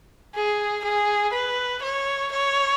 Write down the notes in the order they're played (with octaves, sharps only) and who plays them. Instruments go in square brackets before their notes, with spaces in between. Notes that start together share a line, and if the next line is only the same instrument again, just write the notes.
[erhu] G#4
G#4
B4
C#5
C#5